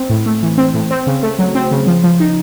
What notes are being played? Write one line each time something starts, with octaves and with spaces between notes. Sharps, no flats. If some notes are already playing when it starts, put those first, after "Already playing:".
Already playing: C4
A2
A3
E3
C4
A2
C4
C#3
A3
F#3
C4
C#3
F3
F3
D#4